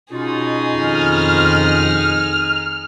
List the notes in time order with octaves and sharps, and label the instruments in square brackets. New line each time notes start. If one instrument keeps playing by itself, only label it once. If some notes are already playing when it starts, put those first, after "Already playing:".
[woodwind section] B2 C#4 F4 [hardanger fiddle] D#4 G#4
[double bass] F2 D#3 [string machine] F6